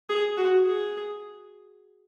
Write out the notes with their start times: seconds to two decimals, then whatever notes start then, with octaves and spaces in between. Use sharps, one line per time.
0.09 G#4
0.37 F#4
0.66 G#4